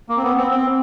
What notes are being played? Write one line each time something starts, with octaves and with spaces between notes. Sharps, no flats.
A#3
C4
B3
C4
C4